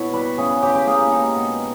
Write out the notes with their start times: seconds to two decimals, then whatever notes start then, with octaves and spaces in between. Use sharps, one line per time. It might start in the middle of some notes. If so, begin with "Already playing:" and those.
Already playing: B2 E4 C#5
0.13 G3 B4
0.38 C#3 G#4
0.62 C#3 G4
0.75 G4
0.87 A#3 G#4
0.99 G4
1.11 G#3 D#4
1.36 B2